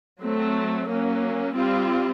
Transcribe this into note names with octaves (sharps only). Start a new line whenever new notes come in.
F#3 A3 C4
F#3 A#3 C#4
G3 C4 F4